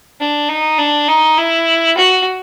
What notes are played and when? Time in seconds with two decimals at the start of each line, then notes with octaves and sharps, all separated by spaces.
0.20 D4
0.48 D#4
0.78 D4
1.08 D#4
1.37 E4
1.97 F#4